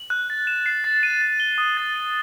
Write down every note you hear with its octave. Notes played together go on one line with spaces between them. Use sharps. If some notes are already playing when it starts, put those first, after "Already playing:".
Already playing: F#7
F#6
A6
E7
C7
A6
D#7
A6
G7
D#6
A6
D#7